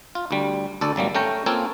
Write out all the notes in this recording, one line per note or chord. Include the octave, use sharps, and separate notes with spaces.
F4
D2 G3
D2 A4 D5
G#1 F#3 G3 A#3
A3 C#4 G5 A#5
A#3 C4 C#4 F4 A4 G#5